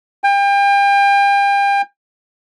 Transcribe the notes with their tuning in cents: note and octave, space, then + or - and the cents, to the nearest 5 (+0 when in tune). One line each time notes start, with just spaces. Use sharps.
G5 +35